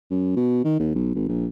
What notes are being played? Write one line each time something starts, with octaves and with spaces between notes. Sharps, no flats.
F#2
B2
D#3
D#2
B1
G#1
A#1